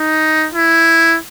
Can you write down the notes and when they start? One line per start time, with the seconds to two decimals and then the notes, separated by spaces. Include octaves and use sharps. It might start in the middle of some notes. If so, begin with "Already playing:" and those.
Already playing: D#4
0.54 E4